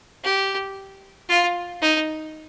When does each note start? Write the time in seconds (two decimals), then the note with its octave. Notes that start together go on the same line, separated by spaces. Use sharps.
0.24 G4
1.29 F4
1.82 D#4